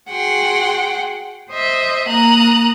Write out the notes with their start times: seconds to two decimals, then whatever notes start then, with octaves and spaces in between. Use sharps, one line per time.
0.10 F#4 G#4 F#5 G5 C6
1.52 C5 D#5 E5
2.08 A#3 A#5 D#6 F#6